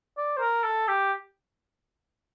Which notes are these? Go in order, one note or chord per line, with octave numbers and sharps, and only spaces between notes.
D5
C5
A#4
A4
G4